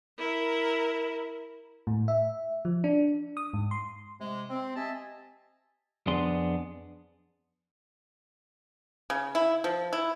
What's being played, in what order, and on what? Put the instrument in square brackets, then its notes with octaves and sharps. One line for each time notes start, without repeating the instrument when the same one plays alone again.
[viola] E4 A#4
[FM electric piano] A2
E5
F3
D4
D#6
G#2
C6
[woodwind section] C3 G#3
C4
G4 D#5 E5 G#5 A5
[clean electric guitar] F2 B3 D4 G#4 C6
[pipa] C#3
E4
F3
E4